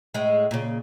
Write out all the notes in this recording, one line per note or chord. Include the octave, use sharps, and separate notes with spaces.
A2 G#3
A#2 C#3